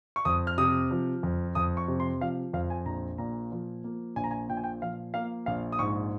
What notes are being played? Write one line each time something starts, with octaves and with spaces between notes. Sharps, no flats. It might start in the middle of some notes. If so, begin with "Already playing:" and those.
C#6
F2 D#6
F6
C3 D#6
F3
F2
F2 D#6
C#6
C3
C6
F3 F5
F2 F5
G#5
A#1 A#5
A#2 A#5
F3
A#3
A#1 G#5
A#5
G#5
A#2 G5
G#5
G5
F3 F5
A#3 F5
A#1 F5
D#6
G#2 C#6